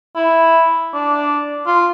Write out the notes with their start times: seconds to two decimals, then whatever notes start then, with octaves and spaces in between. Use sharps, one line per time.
0.16 E4
0.94 D4
1.67 F4